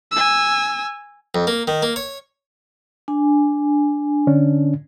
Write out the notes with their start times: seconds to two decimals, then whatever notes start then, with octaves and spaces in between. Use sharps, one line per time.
0.12 G#5 E6
1.35 F2
1.47 A#3
1.68 D#3
1.82 A#3
1.96 C#5
3.08 D4 G#5
4.27 D3 C#4 D4